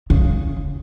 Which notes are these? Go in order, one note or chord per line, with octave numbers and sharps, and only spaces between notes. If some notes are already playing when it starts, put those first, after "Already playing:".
C#3